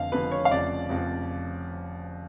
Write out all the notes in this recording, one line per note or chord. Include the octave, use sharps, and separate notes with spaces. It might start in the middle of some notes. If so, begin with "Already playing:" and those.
Already playing: F1 F2 D3 F5
F1 F2 D3 B4
C#5
F5
F1 F2 C#3 D5
F1 F2 C#3